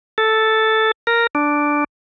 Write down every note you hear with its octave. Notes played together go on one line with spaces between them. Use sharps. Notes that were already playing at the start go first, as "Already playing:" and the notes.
A4
A#4
D4